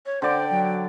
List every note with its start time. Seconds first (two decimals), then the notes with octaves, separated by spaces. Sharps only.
0.06 C#5
0.22 D3 C5 D5 G5
0.51 F#3